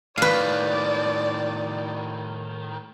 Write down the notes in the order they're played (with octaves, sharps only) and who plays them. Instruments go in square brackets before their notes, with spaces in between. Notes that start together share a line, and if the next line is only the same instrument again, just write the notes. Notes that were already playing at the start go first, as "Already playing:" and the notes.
[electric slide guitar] A2 D#3 [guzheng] B4 F5 [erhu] D5